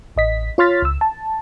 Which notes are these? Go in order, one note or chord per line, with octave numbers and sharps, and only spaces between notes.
A1 D#5 B6
F4 C#5 C6 F6 A6 B6
C#2 E6
A5